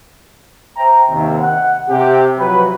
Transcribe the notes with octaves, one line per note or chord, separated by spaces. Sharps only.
C5 E5 G5 A#5
D#2 C3 D#3
F#5
C3 G4
F3 F#3 F#4 B4